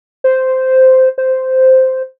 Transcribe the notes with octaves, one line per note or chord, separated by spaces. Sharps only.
C5
C5